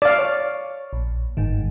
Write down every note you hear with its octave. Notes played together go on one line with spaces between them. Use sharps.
D5 F5
C#5
A#1
G1 G#2 D#3